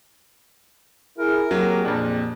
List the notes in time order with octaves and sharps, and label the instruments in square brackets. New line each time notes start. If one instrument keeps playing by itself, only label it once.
[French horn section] E4 G#4 [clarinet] A#4
[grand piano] F#3 A#3 [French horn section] C4 G4 G#4
[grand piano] F2 A#2 D4